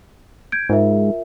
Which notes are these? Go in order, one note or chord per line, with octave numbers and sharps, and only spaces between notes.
G6 G#6 D7
G#2 F4 A#4 E5